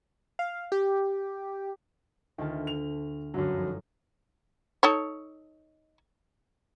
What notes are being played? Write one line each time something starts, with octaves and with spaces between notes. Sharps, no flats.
F5
G4
D2 D#3 F4 A5
F7
G1 F#2 D3 F#3
F3 D#4
D#4 A4 C#5